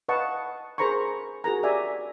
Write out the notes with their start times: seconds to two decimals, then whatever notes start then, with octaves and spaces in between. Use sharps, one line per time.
0.09 B4 D#5 F5 F#5 A5 C#6
0.78 G#4 A#4 C5 A#5 B5 C#6
1.44 F#4 G#4 A#4 A#5
1.63 G4 D5 E5 G#5